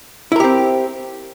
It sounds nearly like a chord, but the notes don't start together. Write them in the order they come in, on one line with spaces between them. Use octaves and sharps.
E4 A#4 G4 C4